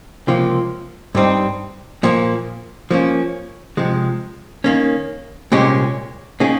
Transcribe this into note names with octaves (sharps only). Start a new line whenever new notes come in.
C#2 C3 F3 A#3 F4
G2 G3 C4 D#4
A#2 F3 A#3
F3 A#3 C#4
C3 F3 G#3
D#3 A#3 C#4
C2 A#2 G#3 C#4 G4
D#3 A#3 C#4 G#4